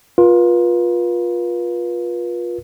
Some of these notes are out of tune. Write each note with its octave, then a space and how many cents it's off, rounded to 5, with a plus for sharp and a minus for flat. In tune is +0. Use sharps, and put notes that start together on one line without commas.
F4 +15 B4 -40